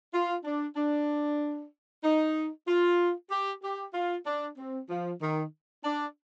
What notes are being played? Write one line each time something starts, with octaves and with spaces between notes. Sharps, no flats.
F4
D4
D4
D#4
F4
G4
G4
F4
D4
C4
F3
D#3
D4